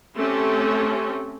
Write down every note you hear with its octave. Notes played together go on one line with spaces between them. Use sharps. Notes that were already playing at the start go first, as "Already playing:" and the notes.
A3 C4 C#4 G4